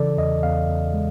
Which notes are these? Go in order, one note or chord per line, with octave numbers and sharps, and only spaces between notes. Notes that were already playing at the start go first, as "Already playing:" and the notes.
Already playing: C#3 E3 A4 D5
E2 D#5
E2 F5
E2
G#3